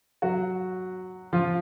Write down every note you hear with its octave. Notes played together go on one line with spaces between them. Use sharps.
F#3 F#4
F3 F4